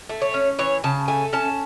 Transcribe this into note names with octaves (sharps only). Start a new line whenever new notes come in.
A3
C#5
C#4
E3 C#5
C#3 A5
A3 G#5
C#4 A5